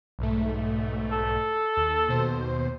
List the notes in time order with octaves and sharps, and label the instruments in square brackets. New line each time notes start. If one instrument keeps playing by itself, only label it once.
[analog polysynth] B1 G#2 A3
[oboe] A4
[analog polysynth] D#2
D#2 B2 C5